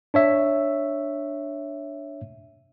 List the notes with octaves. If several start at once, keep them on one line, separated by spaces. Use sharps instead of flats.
D4 C#5 E5